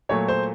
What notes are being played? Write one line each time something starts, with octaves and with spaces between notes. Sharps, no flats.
A#2 F#3 A3 C#5
C5